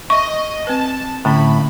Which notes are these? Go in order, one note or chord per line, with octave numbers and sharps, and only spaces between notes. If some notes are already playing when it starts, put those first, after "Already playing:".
D#5 E5 C#6
C4 B4 A5
A2 D3 C#4 B5